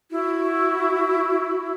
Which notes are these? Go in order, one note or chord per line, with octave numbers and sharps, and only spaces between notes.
E4 F#4